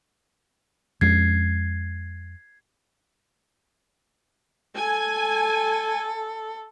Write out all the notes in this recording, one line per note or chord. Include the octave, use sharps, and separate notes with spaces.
F2 G#3 C#4 G#6 C7
A4 G#5